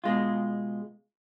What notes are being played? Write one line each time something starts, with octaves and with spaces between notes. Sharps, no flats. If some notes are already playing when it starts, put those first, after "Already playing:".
B2 G#3 F4